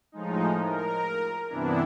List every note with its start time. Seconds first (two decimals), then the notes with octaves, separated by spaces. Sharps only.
0.12 A2 F3 G#3 D#4
0.62 A#4
1.49 G2 C3 E3 B3 D4 E4